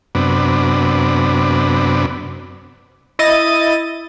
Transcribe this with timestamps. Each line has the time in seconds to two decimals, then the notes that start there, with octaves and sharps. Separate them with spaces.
0.15 F#2 C3 B3 D4
3.19 E4 D#5 A6 D#7